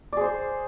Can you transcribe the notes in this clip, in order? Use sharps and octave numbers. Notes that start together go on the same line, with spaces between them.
G#4 C5 D5